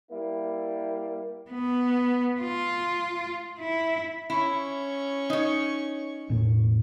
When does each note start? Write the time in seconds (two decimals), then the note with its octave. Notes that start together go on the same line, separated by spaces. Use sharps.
0.11 G3 A#3 E4
1.51 B3
2.42 F4
3.59 E4
4.30 C#4 E4 C#6
5.30 D#4 C#5
6.30 E1 A2 A#3